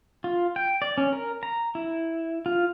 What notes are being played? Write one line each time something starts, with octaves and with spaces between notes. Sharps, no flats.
F4
G5
D5
C#4
A#4
A#5
E4
F4